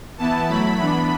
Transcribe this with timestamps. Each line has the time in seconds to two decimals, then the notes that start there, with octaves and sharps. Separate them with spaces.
0.18 E3 B3 E4 A5
0.49 F#3 A3 E4 B5
0.78 E3 B3 D4 B5